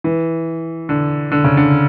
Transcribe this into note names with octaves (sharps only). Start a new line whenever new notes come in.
E3
D3
D3
C#3
D3